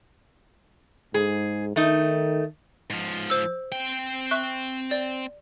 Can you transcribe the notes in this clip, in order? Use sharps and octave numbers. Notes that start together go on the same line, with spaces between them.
G#2 G#4
D#3 A3 D#4
G#2 F3
C5 E6
C4 G5
E5 C#6 F#6
D5